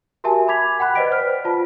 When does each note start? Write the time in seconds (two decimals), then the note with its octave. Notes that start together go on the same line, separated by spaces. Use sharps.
0.24 F#4 G4 A#4 E5 G#5 A5
0.48 B5 D6 G#6 B6 F7
0.80 F#5 G5 B5 F#6
0.95 B4 C5 D5 D#5 B6 D7
1.12 F6
1.45 F4 A5